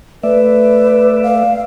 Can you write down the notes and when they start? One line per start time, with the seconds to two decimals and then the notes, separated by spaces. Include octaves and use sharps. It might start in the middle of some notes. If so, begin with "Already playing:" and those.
0.23 A3 B4 D5 E5
1.23 F5